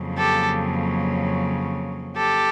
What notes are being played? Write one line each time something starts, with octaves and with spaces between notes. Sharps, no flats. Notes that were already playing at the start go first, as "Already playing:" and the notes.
Already playing: F2 C#3 F#3 A#3
G4 A4
G4 A4